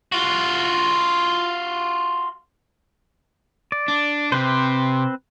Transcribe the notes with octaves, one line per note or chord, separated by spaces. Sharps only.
F4 F#4
D5
D4
C3 C4 B4 C5